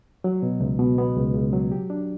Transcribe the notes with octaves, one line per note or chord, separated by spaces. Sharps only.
F#3
B2
C#2
B2
B3
C#2
C#2
F#3
G4
D4